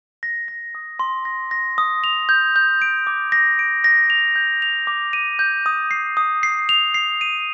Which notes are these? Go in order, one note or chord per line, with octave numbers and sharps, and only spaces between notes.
A#6
A#6
D#6
C6
A#6
A#6
D#6
F7
G6
G6
D7
D6
A#6
D7
A#6
F7
G6
F7
D6
D#7
G6
D#6
C7
D#6
C7
F7
C7
D#7